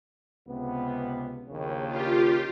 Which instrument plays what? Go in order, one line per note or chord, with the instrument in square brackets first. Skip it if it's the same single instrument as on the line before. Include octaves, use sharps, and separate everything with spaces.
[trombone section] C#2 C3 B3
A#1 D#2 C#3
[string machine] F4 G4